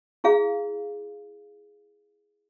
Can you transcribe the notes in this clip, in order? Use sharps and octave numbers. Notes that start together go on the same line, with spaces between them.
E4 G#4 F5